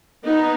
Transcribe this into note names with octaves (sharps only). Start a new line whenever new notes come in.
B3 D#4